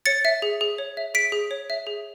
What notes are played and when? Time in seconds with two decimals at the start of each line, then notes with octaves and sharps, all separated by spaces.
0.06 C#5 A6 C#7
0.25 E5
0.42 G#4
0.61 G#4
0.78 C#5
0.97 E5
1.14 G#4 B6 D7
1.32 G#4
1.51 C#5
1.70 E5
1.87 G#4